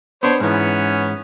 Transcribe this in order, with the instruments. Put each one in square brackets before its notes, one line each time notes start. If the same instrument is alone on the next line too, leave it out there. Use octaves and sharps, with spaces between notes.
[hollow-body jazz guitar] B3 D4 [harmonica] C5 C#5
[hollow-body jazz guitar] G#2 E3 [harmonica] B3 C#4